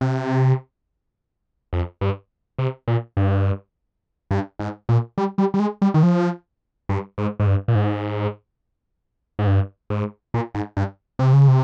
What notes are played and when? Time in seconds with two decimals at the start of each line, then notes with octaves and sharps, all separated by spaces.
0.01 C3
1.73 F2
2.01 G2
2.59 C3
2.88 A#2
3.17 G2
4.31 G2
4.59 G#2
4.89 A#2
5.18 G3
5.38 G3
5.54 G3
5.60 G#3
5.82 G3
5.94 D#3
6.03 F3
6.89 G2
7.18 G#2
7.40 G#2
7.47 G2
7.68 A#2
7.75 G#2
9.39 G#2
9.47 G2
9.90 G#2
10.34 A#2
10.54 G#2
10.77 G2
11.19 C3
11.33 C#3
11.48 C3